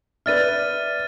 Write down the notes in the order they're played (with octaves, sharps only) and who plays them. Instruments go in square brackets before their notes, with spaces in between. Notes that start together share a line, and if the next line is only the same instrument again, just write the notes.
[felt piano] B4 D5 E5 [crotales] F6 A6 D#7